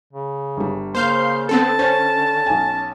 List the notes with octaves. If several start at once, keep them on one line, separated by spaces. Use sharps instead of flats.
C#3
G1 G3
C#3 A#3 C5 F5 C6 G6
D3 B3 C4 A4 A5
C#4 C5 C#5 A6
B1 G#5